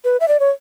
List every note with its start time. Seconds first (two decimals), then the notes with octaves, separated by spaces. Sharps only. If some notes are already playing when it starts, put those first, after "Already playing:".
0.04 B4
0.20 E5
0.28 D5
0.40 C#5